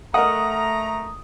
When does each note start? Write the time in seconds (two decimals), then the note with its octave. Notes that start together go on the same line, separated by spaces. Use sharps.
0.14 A3 A#4 D#5 F#5 A#5 D#6